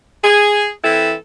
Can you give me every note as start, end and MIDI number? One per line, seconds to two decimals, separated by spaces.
0.24 0.69 68
0.83 1.14 52
0.83 1.14 60
0.83 1.14 64
0.83 1.14 69